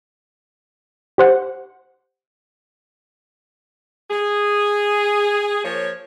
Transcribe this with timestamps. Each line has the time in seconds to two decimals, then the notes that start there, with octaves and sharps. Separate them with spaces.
1.18 G4 C5 F#5
4.11 G#4
5.64 F3 A#3 C#5